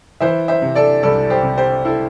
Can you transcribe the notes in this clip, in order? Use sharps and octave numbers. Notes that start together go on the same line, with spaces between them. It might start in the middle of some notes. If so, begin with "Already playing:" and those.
E3 C5 E5
C5 E5
C3
A4 D5
C2 A4 D5
G4 C5
C3
G4 C5
E4 A4